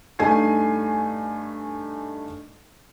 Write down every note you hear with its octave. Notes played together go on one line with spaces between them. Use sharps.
G2 A3 D#4 G#5 G#6 C7